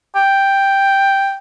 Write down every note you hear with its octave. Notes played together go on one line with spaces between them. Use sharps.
G5